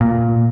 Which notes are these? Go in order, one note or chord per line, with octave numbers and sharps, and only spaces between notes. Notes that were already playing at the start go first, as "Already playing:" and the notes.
A#2